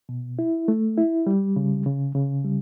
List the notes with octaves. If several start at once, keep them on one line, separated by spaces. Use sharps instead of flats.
B2
E4
A3
E4
G3
C#3
C#3
C#3
G3